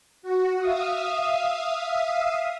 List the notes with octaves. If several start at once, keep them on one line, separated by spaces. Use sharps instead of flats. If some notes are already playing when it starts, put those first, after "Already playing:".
F#4
E5 F5 D#6